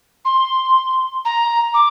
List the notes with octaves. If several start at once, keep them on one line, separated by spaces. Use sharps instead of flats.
C6
A#5
D6